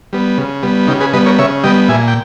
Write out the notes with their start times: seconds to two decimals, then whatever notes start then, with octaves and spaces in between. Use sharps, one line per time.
0.13 G3 B3
0.38 C#3
0.63 G3 B3
0.88 C#3 D#4 G4
1.01 G#4 B4
1.13 G3 B3 B4 D#5
1.26 A#4 C#5
1.39 C#3 C#5 E5
1.64 G3 B3 D#5 G5
1.89 A#2 E5 G#5
2.08 G5